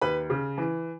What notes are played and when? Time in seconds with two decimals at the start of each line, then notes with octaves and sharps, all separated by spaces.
0.01 D#2 B4 B5
0.30 C#3
0.58 E3